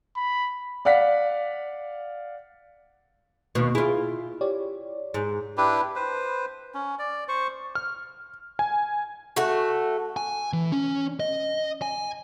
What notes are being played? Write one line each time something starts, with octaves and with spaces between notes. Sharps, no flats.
B5
D5 F5 F#5 B6
D#2 B2
E4 F4 G#4
G4 C#5 D5
G#2
D4 E4 G4 B4
B4 C5
C#4
D5
C5 C#6
F6
G#5
A3 F#4
G#5
E3
C#4
D#5
G#5